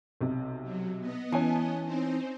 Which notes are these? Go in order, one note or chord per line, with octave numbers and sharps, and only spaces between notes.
B1 C3
F#3
B3 D#5
E3 C#4 G#5 A5
C4 D#4 C5